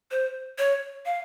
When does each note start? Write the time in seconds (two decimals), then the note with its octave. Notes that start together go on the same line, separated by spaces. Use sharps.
0.11 C5
0.58 C#5
1.06 F5